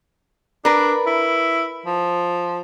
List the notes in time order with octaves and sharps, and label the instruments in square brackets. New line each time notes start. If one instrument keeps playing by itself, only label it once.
[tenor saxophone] D4 [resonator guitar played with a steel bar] A#4 B4
[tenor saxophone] E4
F3